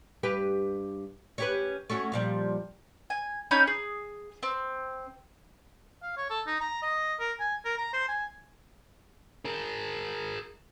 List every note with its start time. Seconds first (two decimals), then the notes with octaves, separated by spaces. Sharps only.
0.23 G2 G4 B4
1.38 C#4 G4 B4
1.90 A3 C#4 F#4
2.12 A#2 F3 G3
3.10 G#5
3.51 C#4 D#4 B5 G6
3.67 G#4
4.43 C4
6.02 F5
6.17 C#5
6.30 A4
6.47 D#4
6.60 A#5
6.82 D#5
7.19 A#4
7.40 G#5
7.65 A#4
7.77 A#5
7.93 C5
8.08 G#5
9.45 G#4 A#4